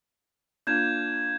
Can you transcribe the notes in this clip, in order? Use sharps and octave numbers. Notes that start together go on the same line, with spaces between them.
A#3 D4 F4 G6 G#6 E7